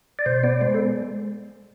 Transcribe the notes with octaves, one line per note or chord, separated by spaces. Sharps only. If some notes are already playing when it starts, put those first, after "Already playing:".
D5
B2 C5
B3 D5
G#3 C5
A4